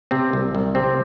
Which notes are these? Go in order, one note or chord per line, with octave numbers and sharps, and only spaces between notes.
C3 C4
C2
C2
C3 C4